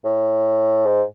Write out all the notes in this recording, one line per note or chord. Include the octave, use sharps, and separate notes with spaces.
A2
G#2